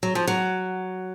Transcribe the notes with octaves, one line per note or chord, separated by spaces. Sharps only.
F#3
F3
F#3